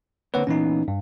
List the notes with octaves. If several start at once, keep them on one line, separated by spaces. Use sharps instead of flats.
D3 A#3 C4 B4 C#5 F#5
A#2 E3 B3 C#4 D#4
G2